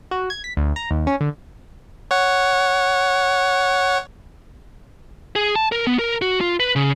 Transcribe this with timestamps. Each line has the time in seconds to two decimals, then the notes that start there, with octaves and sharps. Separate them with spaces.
0.11 F#4
0.30 G#6
0.44 B6
0.57 D2
0.76 A#5
0.91 D#2
1.07 C#4
1.21 D3
2.11 C#5 F#5
5.36 G#4
5.56 A5
5.72 A#4
5.87 B3
5.99 A#4
6.22 F#4
6.41 F4
6.60 B4
6.76 C#3